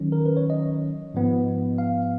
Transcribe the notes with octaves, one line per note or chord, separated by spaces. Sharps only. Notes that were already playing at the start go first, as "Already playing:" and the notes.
Already playing: D#3 F#3 C#4
A#4
B4
C#5
D#5
G#2 F3 B3
F5